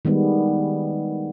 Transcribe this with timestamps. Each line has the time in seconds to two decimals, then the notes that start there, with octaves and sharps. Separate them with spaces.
0.05 D#3 G3 G#3 B3